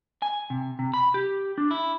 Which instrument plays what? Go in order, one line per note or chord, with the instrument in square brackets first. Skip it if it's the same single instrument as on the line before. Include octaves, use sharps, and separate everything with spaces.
[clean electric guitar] G#5
C3
C3
B5
G4
D4
E4